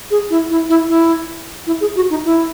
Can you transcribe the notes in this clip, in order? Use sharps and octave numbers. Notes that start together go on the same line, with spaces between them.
G#4
E4
E4
E4
E4
E4
G#4
F#4
D#4
E4